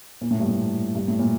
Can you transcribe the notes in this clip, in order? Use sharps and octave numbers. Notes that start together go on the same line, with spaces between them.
A#2
A2
G2
A2
G2
A2
A#2